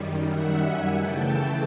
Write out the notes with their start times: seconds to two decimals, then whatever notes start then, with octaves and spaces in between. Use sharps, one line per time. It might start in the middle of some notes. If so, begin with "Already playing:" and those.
Already playing: F#2 D#3 G3
0.29 E5 F#5
0.61 F#5 G#5
0.93 C#3 E3 A3 G5 A5